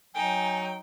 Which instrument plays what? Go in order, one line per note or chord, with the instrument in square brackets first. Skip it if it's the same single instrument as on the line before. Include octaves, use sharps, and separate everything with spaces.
[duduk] F#3 [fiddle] D#4 [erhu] G5 [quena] G#5